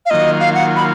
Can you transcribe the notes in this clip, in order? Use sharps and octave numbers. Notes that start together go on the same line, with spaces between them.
F5
D#3 F#3 A#3 F4 D#5
F5
F#5
B5